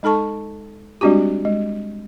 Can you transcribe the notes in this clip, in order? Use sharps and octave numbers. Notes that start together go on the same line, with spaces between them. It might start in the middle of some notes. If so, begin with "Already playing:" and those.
G#3 D#4 A4 A5 C#6
G3 G#3 C4 D4 F#4 G4
G#3